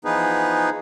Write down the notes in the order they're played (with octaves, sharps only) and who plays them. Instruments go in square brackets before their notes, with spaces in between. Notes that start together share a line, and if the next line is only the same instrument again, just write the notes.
[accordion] E3 F3 B3 D#4 G#4 B4